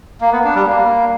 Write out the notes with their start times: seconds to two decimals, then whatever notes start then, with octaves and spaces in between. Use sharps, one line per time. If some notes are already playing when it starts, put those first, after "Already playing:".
0.21 A#3
0.32 B3
0.44 D4
0.55 G3
0.66 A#3